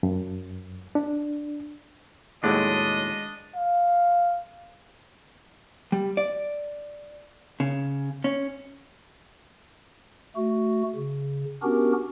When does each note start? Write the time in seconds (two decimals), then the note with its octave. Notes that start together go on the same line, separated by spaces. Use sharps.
0.03 F#2
0.95 D4
2.44 D#2 A2 F#3 G#3 D4 D#5
3.56 F5
5.92 G3
6.17 D5
7.60 C#3
8.24 C#4
10.36 A3 F#4
10.95 C#3
11.63 B3 C#4 D4 F#4 G4 A#4